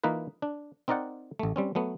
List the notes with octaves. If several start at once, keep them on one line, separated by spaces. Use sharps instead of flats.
E3 A#3 D#4 F4 B4
D4
C4 D#4 A#4 D5 F#5 G5
A1 A3
G3 C4 C#4
F#3 A3 B3